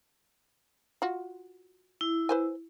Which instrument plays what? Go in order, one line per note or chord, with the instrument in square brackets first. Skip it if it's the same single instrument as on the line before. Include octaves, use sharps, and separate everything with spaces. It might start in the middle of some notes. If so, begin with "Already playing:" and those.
[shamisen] F4 F#4
[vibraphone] E4
[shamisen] B4 C5 G#5